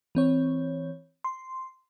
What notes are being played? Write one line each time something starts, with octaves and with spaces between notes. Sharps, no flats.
E3 C4 C#5
C6